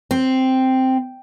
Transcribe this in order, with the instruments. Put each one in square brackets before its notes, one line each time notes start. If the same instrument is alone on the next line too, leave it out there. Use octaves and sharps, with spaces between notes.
[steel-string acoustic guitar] C4